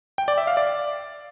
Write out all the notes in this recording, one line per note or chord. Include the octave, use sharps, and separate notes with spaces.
G5
D5
E5
F5
D5